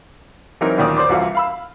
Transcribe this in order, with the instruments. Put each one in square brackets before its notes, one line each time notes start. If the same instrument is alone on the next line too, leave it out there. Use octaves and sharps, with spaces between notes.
[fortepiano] E3 F#3 C4 D#4 A#4
A1 D2 A#2 D#3 D5 D#6
C5 D5 C6 D6
C2 E3 F4 F#4 F5
F5 B5 E6